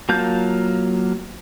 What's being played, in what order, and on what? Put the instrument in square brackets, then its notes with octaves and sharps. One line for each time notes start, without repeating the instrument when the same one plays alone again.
[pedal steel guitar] F#3 A#3 F4 A5 G6